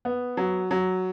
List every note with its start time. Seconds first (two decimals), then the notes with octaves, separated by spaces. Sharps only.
0.05 B3
0.37 F#3
0.71 F#3